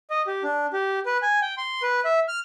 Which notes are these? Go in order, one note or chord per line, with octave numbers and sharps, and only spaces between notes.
D#5
G4
D4
G4
B4
G#5
G5
C6
B4
E5
F6